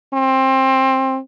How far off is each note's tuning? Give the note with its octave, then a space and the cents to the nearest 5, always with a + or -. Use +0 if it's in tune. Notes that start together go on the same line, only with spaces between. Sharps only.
C4 +20